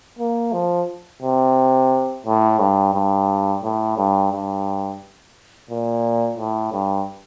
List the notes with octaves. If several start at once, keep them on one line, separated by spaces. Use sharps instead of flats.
A#3
F3
C3
A2
G2
G2
A2
G2
G2
A#2
A2
G2